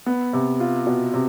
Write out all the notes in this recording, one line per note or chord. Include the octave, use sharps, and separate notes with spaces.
B3
C3
F4
B2
C3